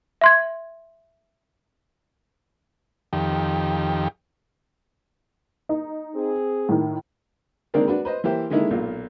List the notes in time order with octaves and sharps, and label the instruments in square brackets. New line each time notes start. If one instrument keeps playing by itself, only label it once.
[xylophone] E5 C6 G#6
[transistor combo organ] F2 D#3 G4
[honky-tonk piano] D#4
[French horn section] C4 G#4
[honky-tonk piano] A2 D#3
[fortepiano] D#3 G#3 A#3 C4 D4 A#4
D4 F#4 B4
B4 C5 D#5
E3 A#3 G4 C5 E5
D3 D#3 G#3 A#3 D#4 E4
B1 A#2 F4